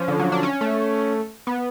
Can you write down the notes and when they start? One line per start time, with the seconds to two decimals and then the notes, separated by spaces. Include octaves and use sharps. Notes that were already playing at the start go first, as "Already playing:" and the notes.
Already playing: F3 C#4
0.08 D3
0.20 F#3
0.32 D4
0.43 C#4
0.61 A3
1.47 B3